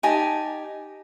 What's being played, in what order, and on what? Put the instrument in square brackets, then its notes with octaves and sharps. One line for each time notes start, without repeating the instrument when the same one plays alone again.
[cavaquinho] D#4 G4 G#5 A5